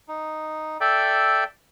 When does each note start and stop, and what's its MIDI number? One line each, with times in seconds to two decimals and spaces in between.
0.08 0.77 63
0.81 1.44 69
0.81 1.44 74
0.81 1.44 76
0.81 1.44 79